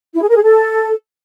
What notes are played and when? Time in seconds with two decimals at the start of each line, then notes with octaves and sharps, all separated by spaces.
0.15 E4
0.22 G#4
0.29 A#4
0.36 G#4
0.43 A4